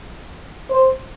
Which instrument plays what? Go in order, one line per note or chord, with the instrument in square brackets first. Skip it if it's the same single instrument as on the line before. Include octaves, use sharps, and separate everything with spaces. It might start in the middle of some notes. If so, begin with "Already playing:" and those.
[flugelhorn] C5